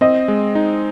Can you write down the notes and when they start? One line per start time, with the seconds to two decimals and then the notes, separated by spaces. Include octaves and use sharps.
0.01 C4 D#5
0.28 G#3
0.55 D#4